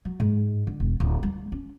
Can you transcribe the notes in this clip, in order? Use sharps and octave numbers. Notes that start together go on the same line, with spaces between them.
F#3
G#2
D3
E1
D1
G3
C#4